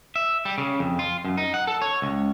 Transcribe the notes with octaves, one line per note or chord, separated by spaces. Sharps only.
E5
G3
C#3
F2
F4
F#2
D#4
F#5
A4
C#5
C#2